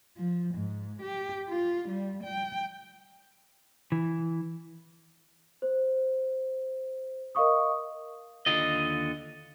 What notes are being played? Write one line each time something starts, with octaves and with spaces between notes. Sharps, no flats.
F3
G#2
G4
F4
G3
G5
E3
C5
A#4 D#5 F5 C#6 D#6
D#2 D3 F4 D#5